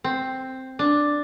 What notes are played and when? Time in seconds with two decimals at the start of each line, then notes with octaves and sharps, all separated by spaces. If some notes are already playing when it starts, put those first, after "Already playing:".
0.04 C4
0.79 D4